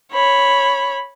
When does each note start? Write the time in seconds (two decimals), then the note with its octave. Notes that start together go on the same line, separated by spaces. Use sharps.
0.12 C#5 B5